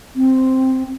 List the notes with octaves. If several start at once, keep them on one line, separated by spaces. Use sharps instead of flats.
C4